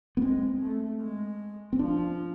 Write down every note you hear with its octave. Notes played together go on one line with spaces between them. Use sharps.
B3
G#3 C4
A3
G#3
C4
F3 D4